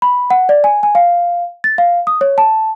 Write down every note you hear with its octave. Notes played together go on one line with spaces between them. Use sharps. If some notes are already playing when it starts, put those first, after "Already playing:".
B5
F#5
D5
G#5
G#5
F5
A6
F5
D#6
C#5
A5